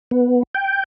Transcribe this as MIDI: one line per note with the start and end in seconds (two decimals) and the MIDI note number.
0.11 0.43 59
0.54 0.84 79